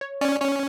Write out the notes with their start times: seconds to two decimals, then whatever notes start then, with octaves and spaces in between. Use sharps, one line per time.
0.01 C#5
0.21 C#4 D5
0.41 C#4 C#5